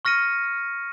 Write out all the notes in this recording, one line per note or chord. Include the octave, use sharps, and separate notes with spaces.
C#6 F6 A#6 C#7 D#7